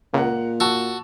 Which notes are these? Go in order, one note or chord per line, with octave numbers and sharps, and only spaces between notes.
C#2 A#2 A#4 F#5
F#4 A5 C#6 E6